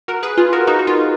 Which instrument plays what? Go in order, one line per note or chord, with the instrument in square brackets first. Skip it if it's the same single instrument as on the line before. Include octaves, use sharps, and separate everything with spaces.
[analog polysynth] F#4 A#4
G#4 B4
F4 G#4
F#4 A#4
D#4 F#4
F#4
F4